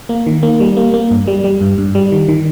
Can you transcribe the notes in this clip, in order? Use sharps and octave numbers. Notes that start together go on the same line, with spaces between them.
A#3
D#3
A#3
G3
A#3
A#3
G2
G3
G3
G2
G2
G3
D#3
D#3